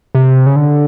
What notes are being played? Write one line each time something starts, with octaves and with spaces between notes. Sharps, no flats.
C3
C#3
D3